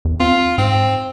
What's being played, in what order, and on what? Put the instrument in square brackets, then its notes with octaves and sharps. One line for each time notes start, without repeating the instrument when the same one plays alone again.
[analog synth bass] E2
[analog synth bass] C4 [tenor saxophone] F4
[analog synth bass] G#2 [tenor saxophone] C4